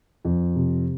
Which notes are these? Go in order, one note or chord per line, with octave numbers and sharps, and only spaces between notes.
F2
C3